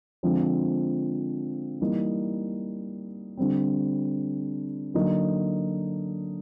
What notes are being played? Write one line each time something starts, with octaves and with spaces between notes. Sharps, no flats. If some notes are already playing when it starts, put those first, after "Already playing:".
D3 F3 G#3 C4
E3 G3 A#3 D#4
D3 G3 C4
D3 F#3 A#3 D#4